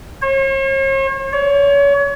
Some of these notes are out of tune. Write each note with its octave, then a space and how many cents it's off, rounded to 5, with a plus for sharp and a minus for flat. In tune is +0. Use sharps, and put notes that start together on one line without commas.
C#5 -45
C#5 +30